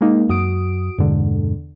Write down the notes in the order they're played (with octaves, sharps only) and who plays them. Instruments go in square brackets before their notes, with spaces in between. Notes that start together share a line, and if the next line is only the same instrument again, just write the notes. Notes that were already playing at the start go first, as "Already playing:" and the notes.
[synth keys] G#3 A#3 D#4
[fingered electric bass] F#2 [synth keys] F#4 D#6 D7
[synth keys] E2 D3 [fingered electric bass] G2 B2 G#3